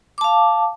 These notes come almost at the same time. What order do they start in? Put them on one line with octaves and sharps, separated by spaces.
D6 A5 F5